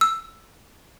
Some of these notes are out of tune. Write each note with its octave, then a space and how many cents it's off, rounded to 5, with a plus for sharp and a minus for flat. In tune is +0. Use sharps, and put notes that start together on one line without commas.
E6 +10